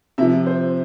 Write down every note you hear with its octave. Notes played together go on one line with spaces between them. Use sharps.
C3 F3 E5
C5